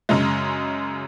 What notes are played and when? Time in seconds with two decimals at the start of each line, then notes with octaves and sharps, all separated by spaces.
0.09 F#2 C#3 G#3